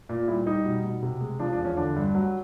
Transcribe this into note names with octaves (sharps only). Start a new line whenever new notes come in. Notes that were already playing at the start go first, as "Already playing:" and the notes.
A#2
G3 E4
G3 D#4
B2
B2
C3
G#3
F3 D4
D4
E2
C#4
D3 D4
G2
F#3